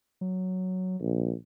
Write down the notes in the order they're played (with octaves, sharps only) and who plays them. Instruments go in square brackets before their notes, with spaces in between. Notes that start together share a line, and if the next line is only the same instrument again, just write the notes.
[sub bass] F#3
[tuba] A#1